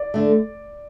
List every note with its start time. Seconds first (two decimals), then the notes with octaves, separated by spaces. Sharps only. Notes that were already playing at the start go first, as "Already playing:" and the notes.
Already playing: D5
0.14 D3 A3